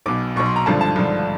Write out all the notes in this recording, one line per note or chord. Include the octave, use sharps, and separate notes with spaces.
B1 B2 D6
B1 B2 C#6
C6
A#5
G#1 G2 D3 F3 A5
A5
G#1 G2 D3 F3